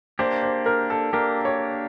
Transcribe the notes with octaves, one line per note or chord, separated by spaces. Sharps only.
A#3 D4 G4 C5
C5
A#4
A4
A#3 D4 G4 A#4
C#5